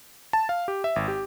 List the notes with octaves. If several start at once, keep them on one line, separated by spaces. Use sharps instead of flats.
A5
F5
G4
E5
G#1
G4